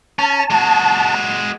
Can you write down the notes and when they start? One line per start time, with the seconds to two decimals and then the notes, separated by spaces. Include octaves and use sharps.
0.19 C#4 A5
0.50 G#3 F#4